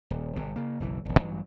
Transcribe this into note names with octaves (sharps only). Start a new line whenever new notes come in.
D#1
G1 B2
C#3 A#3
F#1 B1 E3
D#1 G#1
A1 G2 E3 F#3